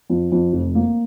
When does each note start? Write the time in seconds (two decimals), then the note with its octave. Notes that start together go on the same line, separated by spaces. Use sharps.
0.10 F2
0.32 F2
0.53 F1
0.75 A#3